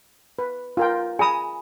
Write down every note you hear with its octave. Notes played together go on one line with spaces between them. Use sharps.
B4
F4 A#4 G5
G#4 G#5 A#5 B5 D#6